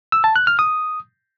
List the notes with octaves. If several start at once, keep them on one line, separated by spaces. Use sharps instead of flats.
E6
A5
F#6
F6
D#6